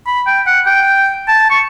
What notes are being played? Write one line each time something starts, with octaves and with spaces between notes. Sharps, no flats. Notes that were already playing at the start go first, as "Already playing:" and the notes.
B5
G5
F#5
G5
A5
C#6